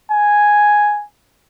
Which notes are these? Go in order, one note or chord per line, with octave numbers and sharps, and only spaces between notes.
G#5